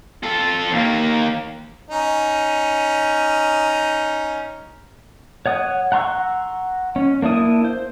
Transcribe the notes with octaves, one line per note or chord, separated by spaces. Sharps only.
F4 A4
D#2 A#3
C#4 D#4
C#5 F#5 D#6
F#5 A#5 C6 C#6 E6
C#4
A#3 D4 E4 D#6
C5